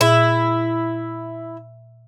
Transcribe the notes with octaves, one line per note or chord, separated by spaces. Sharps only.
A#2 E4